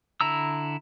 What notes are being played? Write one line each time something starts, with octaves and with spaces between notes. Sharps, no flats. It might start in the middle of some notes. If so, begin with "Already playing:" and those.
D3 E4 A#5 E6